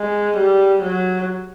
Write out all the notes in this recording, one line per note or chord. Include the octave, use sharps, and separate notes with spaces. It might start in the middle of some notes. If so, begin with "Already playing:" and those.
Already playing: G#3
G3
F#3